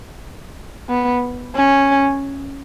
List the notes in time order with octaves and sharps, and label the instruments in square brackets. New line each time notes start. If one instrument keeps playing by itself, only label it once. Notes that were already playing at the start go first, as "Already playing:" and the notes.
[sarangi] B3
C#4